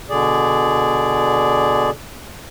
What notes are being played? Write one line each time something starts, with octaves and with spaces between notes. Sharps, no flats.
B2 D3 G#4 D5